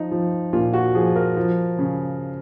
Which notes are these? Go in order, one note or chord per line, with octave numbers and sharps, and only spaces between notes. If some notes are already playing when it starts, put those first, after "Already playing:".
Already playing: F3 D#4
F3
A#2 F4
F#4
F3 G#4
A#4
F3
C#3